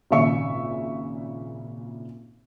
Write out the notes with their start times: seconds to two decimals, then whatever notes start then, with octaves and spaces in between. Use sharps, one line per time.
0.11 G#1 A#2 C#3 E5 C#6 C#7